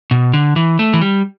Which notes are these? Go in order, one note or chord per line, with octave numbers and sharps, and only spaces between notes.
B2
D3
E3
A3
E3
G3